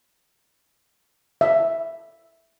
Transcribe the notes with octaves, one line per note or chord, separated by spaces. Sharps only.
E5